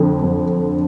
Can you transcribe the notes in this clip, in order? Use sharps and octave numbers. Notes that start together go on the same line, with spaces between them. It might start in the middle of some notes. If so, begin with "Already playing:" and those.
Already playing: F2 D3
F2